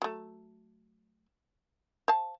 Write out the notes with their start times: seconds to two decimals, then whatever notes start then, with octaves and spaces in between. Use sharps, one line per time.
0.02 F#3 A3
2.08 C5 F5 A5